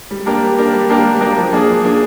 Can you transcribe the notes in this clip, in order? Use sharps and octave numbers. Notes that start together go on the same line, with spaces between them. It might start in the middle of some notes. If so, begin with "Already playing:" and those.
G3
A#3 D4 G4 A#4
G3
A#3 D4 G4 A#4
G3
A#3 D4 G4 A#4
G3
A#3 D4 G4 A#4
F3
A#3 D4 G#4
F3
A#3 D4 G#4